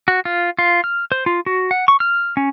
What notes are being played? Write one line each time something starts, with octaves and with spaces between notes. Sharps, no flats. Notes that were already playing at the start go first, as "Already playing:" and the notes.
F#4
F4
F4
F6
C5
F4
F#4
F#5
C#6
F6
C#4